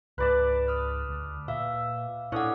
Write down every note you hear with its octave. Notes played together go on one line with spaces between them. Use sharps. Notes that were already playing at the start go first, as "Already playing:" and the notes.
C#2 G#2 B4 D5 A5
D#6 F6 F#6
D2
A#2 E5 F5
A#2 C#4 D4 E4 A4 F#5 D#6